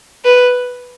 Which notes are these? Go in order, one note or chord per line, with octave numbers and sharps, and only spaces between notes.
B4